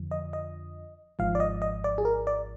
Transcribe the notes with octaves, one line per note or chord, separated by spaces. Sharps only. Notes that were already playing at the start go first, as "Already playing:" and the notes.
Already playing: F2 D3 F3
D#5
D#5
G#1 G#2 F3 F5
D5
D#5
D#5
D5
G#4
A#4
D5